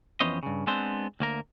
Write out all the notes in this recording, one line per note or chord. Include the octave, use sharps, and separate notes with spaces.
F2 E3 B3 C#4 C5 D#5
G2 C#3
G#3 B3 C4 D4 C5
D2 A#3 A#4